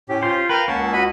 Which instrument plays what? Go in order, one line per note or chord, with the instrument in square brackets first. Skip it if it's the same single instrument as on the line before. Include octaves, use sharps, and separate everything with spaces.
[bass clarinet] A2 [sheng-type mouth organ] C#4 G4
[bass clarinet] F4 [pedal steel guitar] C5
[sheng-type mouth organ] A#4 F5 G5 [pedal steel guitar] B4
[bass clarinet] C#2 [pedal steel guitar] A#3 C#4 [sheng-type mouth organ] F#5 A5
[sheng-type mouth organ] F#4 D#5 B5